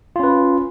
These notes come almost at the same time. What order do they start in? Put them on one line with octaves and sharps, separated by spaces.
F4 C#4 B4